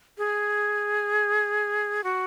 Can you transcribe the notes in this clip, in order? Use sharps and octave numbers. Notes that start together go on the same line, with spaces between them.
G#4
F#4